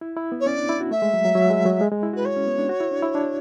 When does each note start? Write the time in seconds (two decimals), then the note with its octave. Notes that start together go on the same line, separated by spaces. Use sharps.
0.01 E4
0.16 E4
0.32 B3
0.40 C#5
0.46 C#4 D5
0.58 D4
0.69 E4
0.80 F#4
0.91 A3 E5
1.02 G#3
1.14 F#3
1.25 F#3
1.35 F#3
1.50 G#3
1.66 F#3
1.81 G#3
1.92 G#3
2.03 E4
2.13 F#4 B4
2.25 C#5
2.37 C#4
2.47 B3
2.58 D4
2.69 F#4
2.80 E4
2.91 D4
3.02 E4
3.15 D4